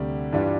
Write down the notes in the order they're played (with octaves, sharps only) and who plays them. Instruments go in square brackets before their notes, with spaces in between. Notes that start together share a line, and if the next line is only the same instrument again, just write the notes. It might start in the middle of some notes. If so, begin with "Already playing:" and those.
Already playing: [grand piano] D2 C3 G3
G2 E3 G3 D4 F4